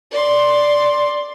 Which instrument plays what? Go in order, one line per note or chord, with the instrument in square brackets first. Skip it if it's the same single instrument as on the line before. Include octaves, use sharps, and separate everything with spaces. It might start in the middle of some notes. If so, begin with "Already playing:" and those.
[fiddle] D5 C6